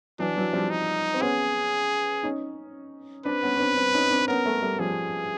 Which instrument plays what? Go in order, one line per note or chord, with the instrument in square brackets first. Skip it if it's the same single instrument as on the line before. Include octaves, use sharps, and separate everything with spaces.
[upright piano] E3 F#3 [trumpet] D4
[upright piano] E3 F#3
F3 G3
[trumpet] D#4
[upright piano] C4
[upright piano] B3 C#4 [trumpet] G#4
[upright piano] C#4 D#4
[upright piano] C4 D4 [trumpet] B4
[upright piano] B3 C#4
C#4
C4 D4
C4 D4
C#4 D#4
C4 D4
[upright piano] B3 C#4 [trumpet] A#4
[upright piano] A3 B3
G3 A3
[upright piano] F3 G3 [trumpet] G#4